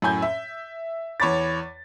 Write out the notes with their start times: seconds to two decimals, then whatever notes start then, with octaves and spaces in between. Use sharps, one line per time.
0.02 F#2 A2 G#5 G6
0.22 E5
1.20 E2 C#5 B5 D6 A6